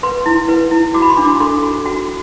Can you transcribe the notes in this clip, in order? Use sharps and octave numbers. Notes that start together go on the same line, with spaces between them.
B4 C6
E4
B4
E4
F#4 D6
B5
C6
D4
D6
A4 C6
F#4
F#4